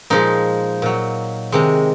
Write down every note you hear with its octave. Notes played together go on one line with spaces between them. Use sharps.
A#2 F3 G#3 D#4
A#2 F#3
C3 D#3 G#3